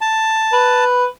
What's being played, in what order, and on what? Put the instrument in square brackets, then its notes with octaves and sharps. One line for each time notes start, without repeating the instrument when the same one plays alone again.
[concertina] A5
[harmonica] B4